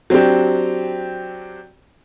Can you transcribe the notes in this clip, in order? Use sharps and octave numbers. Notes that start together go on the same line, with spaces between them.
F#3 C4 D4 G4